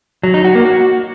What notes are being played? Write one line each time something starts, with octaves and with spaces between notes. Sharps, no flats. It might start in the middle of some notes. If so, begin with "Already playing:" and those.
F#3
D#4
F#4
A#3
F#4